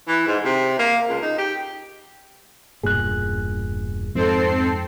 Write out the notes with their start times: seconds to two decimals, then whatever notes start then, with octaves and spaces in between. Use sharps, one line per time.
0.08 E3
0.27 G#2
0.45 C3
0.79 A#3
1.09 C#2
1.22 D#4
1.38 G4
2.83 E1 G2 A#2 G#4 F#6
4.15 F2 G#2 C4 A4 C7